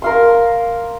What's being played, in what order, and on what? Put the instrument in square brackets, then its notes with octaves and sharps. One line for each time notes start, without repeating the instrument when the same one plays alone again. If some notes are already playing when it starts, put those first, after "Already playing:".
[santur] A#4 F5 C6